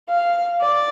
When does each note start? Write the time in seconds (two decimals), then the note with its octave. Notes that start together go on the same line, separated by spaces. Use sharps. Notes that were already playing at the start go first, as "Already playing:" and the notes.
0.09 F5
0.61 D5